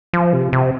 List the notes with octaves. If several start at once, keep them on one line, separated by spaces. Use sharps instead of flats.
F3
C3
C3